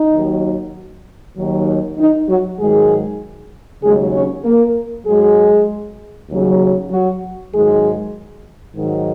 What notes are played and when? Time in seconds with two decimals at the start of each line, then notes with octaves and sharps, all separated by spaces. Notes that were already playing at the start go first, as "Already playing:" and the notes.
Already playing: D#4
0.13 D#2 D#3 F#3
1.37 D#2 D#3 F#3
1.98 D#3 D#4
2.29 F#3 F#4
2.60 G#2 D#3 F#3 G#3 G#4
3.83 D#2 C#3 F#3 G#3 G#4
4.13 C#4 C#5
4.45 A#3 A#4
5.07 G#2 F#3 G#3 G#4
6.30 D#2 C#3 F#3
6.91 F#3 F#4
7.53 G#2 D#3 F#3 G#3 G#4
8.76 G#2 D#3 F#3